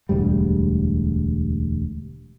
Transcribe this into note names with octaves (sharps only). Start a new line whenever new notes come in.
E1 D2 G#2 G3